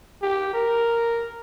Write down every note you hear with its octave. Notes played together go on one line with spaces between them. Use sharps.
G4
A#4